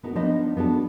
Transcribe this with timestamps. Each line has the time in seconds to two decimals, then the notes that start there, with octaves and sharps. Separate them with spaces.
0.03 B3 D#4 F#4 A#4
0.15 F3 B3 D4 D#4 B4 D#5
0.57 B3 D4 F#4 A4